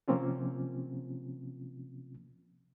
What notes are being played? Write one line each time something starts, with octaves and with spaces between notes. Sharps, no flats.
C3 F3 A#3 C4 C#4 F4